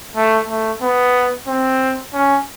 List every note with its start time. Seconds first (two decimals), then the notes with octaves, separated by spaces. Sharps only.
0.15 A3
0.48 A3
0.82 B3
1.47 C4
2.13 C#4